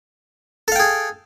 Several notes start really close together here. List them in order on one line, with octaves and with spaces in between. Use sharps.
A4 F5 G5 G#4